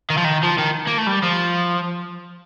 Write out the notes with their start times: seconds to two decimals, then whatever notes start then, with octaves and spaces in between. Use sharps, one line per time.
0.10 D#3
0.17 F3
0.24 D#3
0.43 F3
0.58 D#3
0.87 A#3
0.97 A3
1.07 G3
1.23 F3